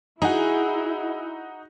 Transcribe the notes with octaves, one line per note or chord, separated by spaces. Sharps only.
D#4 E4 F#4 G#4